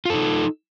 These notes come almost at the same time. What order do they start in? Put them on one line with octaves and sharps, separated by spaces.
F4 A4 D#4